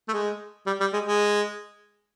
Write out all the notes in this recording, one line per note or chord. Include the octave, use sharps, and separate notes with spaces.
A3
G#3
G3
G3
G#3
G#3